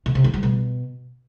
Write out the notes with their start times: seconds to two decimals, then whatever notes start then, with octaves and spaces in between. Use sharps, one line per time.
0.06 B2
0.15 C3
0.24 E3
0.34 G3
0.43 B2